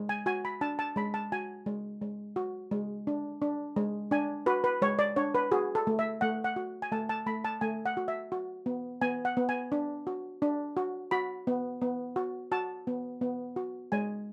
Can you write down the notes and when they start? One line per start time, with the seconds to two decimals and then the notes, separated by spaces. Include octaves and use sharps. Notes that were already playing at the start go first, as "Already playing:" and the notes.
Already playing: G#3
0.09 G#5
0.26 F#4 G#5
0.45 B5
0.61 D4 A5
0.79 A5
0.96 G#3 B5
1.14 A5
1.32 F#4 G#5
1.66 G#3
2.02 G#3
2.36 F#4
2.71 G#3
3.07 D4
3.42 D4
3.76 G#3
4.11 D4 G#5
4.46 F#4 B4
4.64 B4
4.82 G#3 C#5
4.99 D5
5.16 D4 C#5
5.35 B4
5.51 F#4 G#4
5.75 A4
5.87 A3
5.99 E5
6.21 A3 F#5
6.44 F#5
6.56 F#4
6.82 G#5
6.92 A3 A5
7.09 A5
7.26 A3 B5
7.45 A5
7.61 A3 G#5
7.86 F#5
7.97 F#4
8.08 E5
8.32 F#4
8.66 B3
9.01 B3 G#5
9.25 F#5
9.37 B3
9.49 G#5
9.72 D4
10.07 F#4
10.42 D4
10.77 F#4
11.11 F#4 B5
11.47 B3
11.81 B3
12.16 F#4
12.52 F#4 A5
12.87 B3
13.21 B3
13.56 F#4
13.92 G#3 G#5